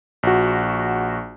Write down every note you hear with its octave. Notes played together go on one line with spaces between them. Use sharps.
A#1 F#4